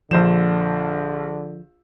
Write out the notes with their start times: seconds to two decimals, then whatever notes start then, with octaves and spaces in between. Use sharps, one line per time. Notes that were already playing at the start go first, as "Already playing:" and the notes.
0.11 A#1 D3 F3 C5 E7